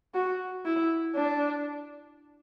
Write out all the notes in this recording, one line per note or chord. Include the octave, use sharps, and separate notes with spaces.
F#4
E4
D4